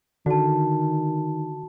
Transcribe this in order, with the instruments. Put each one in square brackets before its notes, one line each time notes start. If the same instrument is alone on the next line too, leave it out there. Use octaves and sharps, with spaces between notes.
[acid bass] D3 [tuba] D#3 [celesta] F#4 A5